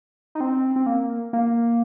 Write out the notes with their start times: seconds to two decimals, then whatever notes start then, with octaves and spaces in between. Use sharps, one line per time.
0.35 D#4
0.41 C4
0.76 C4
0.86 A#3
1.33 A#3